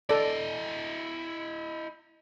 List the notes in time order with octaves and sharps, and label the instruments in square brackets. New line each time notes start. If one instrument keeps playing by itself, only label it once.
[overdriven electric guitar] E4 D#5 [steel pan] A4 D5